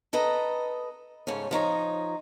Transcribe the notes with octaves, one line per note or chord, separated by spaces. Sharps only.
A4 B4 D#5 A#5
G#2 C#3 A3 C#4
F3 D#4 C#5 A#5